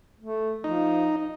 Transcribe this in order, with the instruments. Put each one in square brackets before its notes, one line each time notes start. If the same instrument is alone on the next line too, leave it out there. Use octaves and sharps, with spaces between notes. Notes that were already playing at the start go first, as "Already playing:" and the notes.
[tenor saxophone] A3
[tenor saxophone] F3 [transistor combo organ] D#4